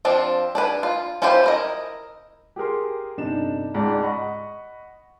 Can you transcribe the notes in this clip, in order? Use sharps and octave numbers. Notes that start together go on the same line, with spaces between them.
F3 C4 D4 F4
D4 G#4 B4
F4
C#4 E4 F4 G4 C5
E4 A#4 D#5
G4 G#4 A#4 C6
G1 C3 D4 D#4 E7
C#2 G#2 D5 A5
D#5 F#5 B5 C#6